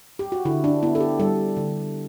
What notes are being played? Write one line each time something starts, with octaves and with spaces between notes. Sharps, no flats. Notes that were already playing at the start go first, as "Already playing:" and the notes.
G4
F#4
D3 E4
D4
B3 E4
A4
G4
G3 A4
D3